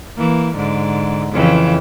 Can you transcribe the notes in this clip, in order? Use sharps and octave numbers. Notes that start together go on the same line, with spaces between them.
E3 A#3
G#2 D3
F2 C#3 E3